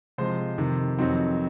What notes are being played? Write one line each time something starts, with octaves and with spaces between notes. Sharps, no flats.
C3 F3 G#3 C5 C6
F2 C3 D#3
F2 D#3 F#3 C4 D#4